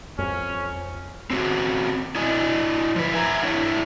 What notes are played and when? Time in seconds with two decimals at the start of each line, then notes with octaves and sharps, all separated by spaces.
0.19 F2 C#4
1.30 C4 C#4 F#4
2.15 E4 D5 D#5 G#5
2.96 F3 B4
3.14 E5 G#5 A#5
3.43 D4 E4 C#5